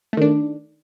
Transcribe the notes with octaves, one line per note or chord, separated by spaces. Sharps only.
D#3 A3 D4